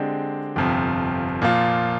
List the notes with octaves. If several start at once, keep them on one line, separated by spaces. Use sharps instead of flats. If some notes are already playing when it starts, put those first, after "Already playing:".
Already playing: D3 G#3 C4 G4 D5
G1 F2 C3 F3
A#2 F3 A#3 F4